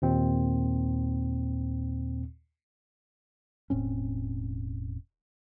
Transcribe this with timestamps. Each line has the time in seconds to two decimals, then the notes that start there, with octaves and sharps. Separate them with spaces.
0.02 D#2 A#2 C4
3.70 E1 A2 C4 C#4